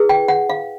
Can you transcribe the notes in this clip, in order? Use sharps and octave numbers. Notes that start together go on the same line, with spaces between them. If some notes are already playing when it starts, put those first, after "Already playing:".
Already playing: E4 G#4 B4
G5
F#5
F5